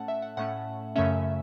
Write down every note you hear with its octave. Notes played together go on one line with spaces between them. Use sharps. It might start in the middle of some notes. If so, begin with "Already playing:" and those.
Already playing: A2 A3 C#4 F#5 A5
E5
F#5
A2 A3 C#4 F#5
F#2 C#3 A3 C#4 E5